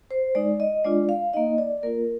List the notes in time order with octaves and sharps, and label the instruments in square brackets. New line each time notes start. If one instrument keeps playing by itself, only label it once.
[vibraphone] C5
G#3 D#4 D5
D#5
G#3 D4 F4 D5
F5
A#3 D#4 D#5
D5
A#3 F4 A#4